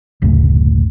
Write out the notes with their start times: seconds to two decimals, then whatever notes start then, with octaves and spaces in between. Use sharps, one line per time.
0.22 F#1 D2 A2 C#3